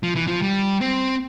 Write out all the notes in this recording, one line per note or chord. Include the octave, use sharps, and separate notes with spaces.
F3
E3
F3
G3
C4